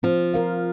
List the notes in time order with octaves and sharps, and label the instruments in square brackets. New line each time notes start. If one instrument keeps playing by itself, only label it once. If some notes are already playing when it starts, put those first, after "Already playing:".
[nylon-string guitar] F3 [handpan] C4
[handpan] F4 A#4 F5